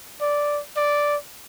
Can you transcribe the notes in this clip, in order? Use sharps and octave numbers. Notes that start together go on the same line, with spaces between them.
D5
D5